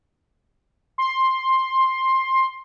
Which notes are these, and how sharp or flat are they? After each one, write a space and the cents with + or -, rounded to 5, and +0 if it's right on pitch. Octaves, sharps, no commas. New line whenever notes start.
C6 +10